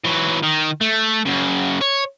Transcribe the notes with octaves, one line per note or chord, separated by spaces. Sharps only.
E3 F#3
D#3
A3
F#2 C#3
C#5